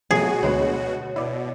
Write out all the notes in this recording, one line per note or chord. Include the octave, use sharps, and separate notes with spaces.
B2 F3 F#3 A3 F#4 G#4
D2 G#3 B4 C#5
B2 E4 D5